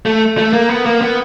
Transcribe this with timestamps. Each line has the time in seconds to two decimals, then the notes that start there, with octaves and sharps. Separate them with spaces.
0.06 A3
0.38 A3
0.53 A#3
0.70 B3
0.86 A#3
1.02 B3